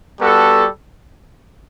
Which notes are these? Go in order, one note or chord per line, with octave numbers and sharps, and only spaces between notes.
G3 B3 F#4 A4